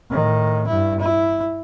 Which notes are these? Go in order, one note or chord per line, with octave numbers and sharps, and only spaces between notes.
A2 D#3
G2 E4
E4